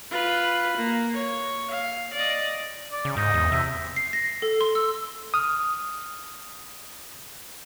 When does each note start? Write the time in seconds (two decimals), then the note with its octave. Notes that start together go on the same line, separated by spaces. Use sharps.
0.11 F4 B4
0.77 A#3
1.13 C#5
1.71 F5
2.13 D5 D#5
2.92 D5
3.05 C#3
3.17 G#2 D#4
3.34 E2
3.52 C3 E5
3.96 C7
4.13 A#6
4.42 A4
4.61 C6
4.75 E6
5.34 D#6 F6